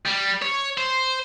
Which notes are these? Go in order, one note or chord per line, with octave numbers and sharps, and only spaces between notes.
G3
C#5
C5